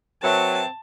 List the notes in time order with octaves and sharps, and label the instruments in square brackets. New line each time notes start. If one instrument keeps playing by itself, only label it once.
[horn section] F#3 [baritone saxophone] C4 [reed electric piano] A#4 B4 E5 [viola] A5